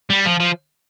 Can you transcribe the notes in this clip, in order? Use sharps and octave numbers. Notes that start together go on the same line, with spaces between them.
G3
F3
F3